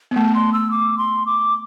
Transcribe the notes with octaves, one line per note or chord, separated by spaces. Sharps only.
B3
A3 A5
C6
E6
D6
C6
D6